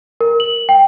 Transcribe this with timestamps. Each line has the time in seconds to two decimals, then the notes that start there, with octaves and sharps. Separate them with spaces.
0.21 A#4
0.40 F#7
0.69 G5